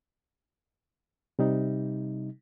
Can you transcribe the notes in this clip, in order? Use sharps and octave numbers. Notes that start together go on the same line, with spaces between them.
C3 G3 D#4